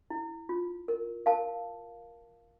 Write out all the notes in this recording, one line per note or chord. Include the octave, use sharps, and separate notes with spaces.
E4
F4
A#4
A#4 F5 A5